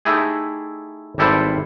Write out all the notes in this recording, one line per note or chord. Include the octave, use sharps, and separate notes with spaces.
A3 D#4 E4 G4 G#4
G#1 G3 E4 A4 B4 C5